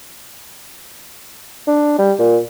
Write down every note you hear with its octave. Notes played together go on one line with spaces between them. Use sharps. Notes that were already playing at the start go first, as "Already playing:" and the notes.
D4
G3
A#2